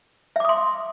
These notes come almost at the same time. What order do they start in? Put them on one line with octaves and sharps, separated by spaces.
E5 D6 D#6 C6